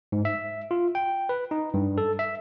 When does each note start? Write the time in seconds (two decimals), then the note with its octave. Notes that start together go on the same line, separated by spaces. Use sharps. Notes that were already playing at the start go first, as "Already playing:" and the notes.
0.12 G#2
0.25 E5
0.71 F4
0.95 G5
1.29 B4
1.51 D#4
1.74 G2
1.98 A4
2.19 E5